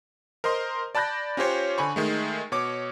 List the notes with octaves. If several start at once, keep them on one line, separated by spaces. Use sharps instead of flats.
A#4 C5 D#5 C6
D5 A5 B5 F#6 G6 A#6
C#4 F4 G4 C5 C#5
D3 G#5 B5 C#6
D#3 G#3 A3
B2 C#5 D6